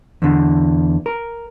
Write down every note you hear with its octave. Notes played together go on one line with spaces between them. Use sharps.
E2 D3
A#4